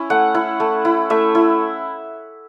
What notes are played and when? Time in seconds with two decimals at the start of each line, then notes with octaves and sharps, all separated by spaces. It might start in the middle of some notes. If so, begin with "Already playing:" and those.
Already playing: C#4 E4
0.10 A3 F#5
0.35 E4
0.60 A3
0.85 E4
1.10 A3 E5
1.35 E4